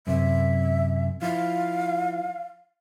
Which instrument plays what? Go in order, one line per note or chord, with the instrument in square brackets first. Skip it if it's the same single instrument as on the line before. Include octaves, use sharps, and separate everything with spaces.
[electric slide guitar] F#2 C3 [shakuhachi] E5
[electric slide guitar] F3 E4 [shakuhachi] F5